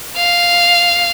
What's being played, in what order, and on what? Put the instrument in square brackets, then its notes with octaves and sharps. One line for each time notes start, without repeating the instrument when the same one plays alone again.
[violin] F5